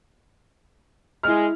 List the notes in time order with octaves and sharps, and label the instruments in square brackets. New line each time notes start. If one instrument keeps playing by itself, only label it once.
[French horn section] G#3 [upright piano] E4 F6